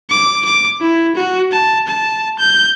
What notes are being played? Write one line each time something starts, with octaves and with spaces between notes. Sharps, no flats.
D6
D6
E4
F#4
A5
A5
G6